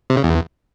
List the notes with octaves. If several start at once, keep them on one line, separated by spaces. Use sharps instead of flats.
C3
C#3
E2